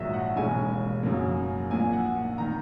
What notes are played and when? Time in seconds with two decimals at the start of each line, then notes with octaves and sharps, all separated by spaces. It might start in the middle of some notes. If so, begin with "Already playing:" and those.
Already playing: A#1 G#2 D#3 F#3 A#3 D#5 E5
0.13 F#5
0.36 E1 D#2 C#3 G#3 G#5
1.03 F#2 C#3 F#3 A#3
1.71 A#1 A#2 A#3 G#5
1.93 F#5
2.38 D#3 A#3 A#5